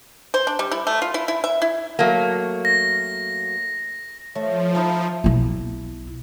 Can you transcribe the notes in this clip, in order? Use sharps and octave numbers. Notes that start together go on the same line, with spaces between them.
C5
D4
G3
E4
A3
F4
E4
E4
E5
E4
F#3 A3 A#3
A#6
F3 A3 C#5
D#4 E4 A4 A5
B1 E4